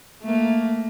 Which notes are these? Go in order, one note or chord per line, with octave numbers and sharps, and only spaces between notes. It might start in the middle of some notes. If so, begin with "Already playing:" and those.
A3 A#3